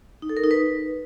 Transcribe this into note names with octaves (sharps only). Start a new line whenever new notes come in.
D#4
A4
A#4
D#4
B4